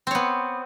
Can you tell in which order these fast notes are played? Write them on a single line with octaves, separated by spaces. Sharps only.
C4 C#5 B3